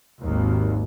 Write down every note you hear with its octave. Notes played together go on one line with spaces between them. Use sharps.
G#1 D#2